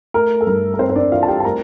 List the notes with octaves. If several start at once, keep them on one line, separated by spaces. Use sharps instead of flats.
A3 A#4
A4
G2 A#4
A#4
C4 C5
C5
D4 D5
E3 F4 F5
A5
G4 G5
A5
A3 A#4 A#5